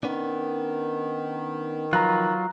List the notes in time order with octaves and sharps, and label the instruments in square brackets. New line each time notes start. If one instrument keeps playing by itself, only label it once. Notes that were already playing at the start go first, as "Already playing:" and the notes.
[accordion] D#3 [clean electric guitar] B3 C#4 D4
[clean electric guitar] F3 B4 [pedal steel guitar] F#3 F4 [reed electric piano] A#5 F#6